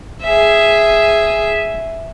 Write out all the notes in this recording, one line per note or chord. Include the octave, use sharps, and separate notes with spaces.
G#4 E5